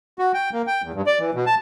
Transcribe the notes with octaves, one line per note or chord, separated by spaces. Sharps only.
F#4
G5
A#3
G5
E2
G2
D5
E3
B2
A5